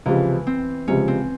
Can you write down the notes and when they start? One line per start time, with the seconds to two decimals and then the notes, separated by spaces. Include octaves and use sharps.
0.06 C#2 C3 E3 F3 G#3
0.47 C4
0.88 C#2 C3 F3 G#3 C#4
1.08 C4